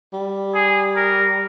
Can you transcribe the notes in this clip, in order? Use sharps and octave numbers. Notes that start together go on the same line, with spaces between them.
G3
G#4
A#4